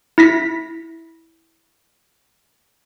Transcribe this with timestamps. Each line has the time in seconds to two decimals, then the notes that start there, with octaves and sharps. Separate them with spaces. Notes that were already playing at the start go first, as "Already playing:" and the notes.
0.18 E4 A#6 B6